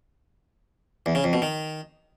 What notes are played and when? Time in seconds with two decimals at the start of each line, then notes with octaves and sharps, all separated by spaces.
1.06 E2
1.15 C#3
1.24 F2
1.33 B2
1.42 D#3